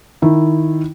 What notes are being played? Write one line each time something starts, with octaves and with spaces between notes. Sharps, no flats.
D#3 E4